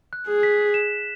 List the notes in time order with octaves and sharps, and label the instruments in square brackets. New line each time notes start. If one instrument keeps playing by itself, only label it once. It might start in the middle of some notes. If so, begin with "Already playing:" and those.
[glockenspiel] F#6
[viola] G#4
[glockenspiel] B6
E7